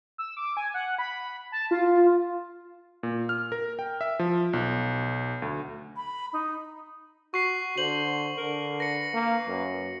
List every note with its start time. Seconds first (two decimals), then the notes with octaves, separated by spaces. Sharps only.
0.18 E6
0.37 D6
0.57 G#5
0.74 F#5
0.98 B5
1.52 A5
1.71 F4
3.03 A#2
3.29 F6
3.52 A#4
3.79 G5
4.01 E5
4.19 F3
4.53 B1
5.42 D2
5.96 B5
6.33 D#4
7.34 F#4 C#6 C7
7.78 D3 C5 F#7
8.37 D3 A#4
8.80 B4 A#6 C#7
9.14 A#3
9.48 F#2